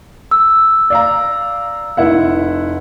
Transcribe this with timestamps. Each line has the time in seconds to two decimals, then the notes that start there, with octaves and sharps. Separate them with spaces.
0.31 E6
0.90 D5 F5 A#5
1.97 F1 E4 F#5